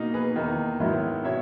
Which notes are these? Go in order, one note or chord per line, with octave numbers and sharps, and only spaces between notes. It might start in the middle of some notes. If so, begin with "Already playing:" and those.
Already playing: B2 A#3 D#4
G#4 B4
E2 D#3 A#3 D#4
G#2 D#3 F#3 B3 E4
B2 C#5 E5